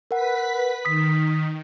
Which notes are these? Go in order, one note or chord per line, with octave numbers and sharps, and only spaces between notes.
A#4 B4 F#5 B6
D#3 D#6 B6